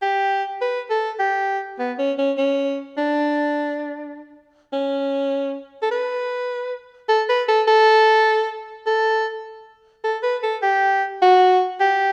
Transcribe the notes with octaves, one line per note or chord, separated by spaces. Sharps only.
G4
B4
A4
G4
B3
C#4
C#4
C#4
D4
C#4
A4
B4
A4
B4
A4
A4
A4
A4
B4
A4
G4
F#4
G4